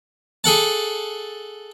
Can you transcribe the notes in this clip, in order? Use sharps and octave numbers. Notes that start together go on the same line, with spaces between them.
G#4 A4 F#5 A5